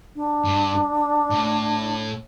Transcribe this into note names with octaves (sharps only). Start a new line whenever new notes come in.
D4
G2
A2